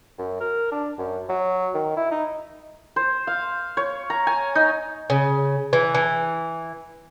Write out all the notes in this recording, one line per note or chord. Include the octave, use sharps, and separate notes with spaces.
F#2
A#4
D4
F#2
F#3
D#3
E4
D#4
C5
F5
C#5
A#5
G#5
D#4
C#3
E3
E3